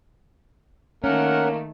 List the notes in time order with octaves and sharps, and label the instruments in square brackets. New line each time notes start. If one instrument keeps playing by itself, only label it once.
[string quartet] D#3 A3 [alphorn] A#3 [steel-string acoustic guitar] C#4 [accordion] A#4 F#5